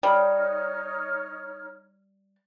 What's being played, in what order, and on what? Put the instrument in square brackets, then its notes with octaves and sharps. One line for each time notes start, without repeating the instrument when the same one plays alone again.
[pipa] G3 [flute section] D#4 C#5 F6